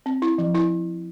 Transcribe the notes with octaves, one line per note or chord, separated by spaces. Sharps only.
C4
E4
F3
E4